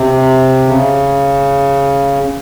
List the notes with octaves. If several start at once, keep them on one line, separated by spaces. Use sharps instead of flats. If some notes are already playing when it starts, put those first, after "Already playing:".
Already playing: C3
C#3